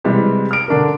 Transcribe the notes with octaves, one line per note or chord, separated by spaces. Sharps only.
C3 E3 G3 G#3
F6 D7
D3 D4 A#4